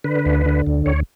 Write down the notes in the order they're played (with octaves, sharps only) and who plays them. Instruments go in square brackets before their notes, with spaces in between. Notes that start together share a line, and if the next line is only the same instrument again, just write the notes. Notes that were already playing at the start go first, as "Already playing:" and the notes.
[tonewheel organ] D3 B4
D2
D3
D2
D2 C#5